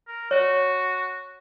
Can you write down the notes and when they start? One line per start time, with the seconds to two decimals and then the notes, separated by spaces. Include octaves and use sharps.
0.08 A#4
0.31 F#4 C#5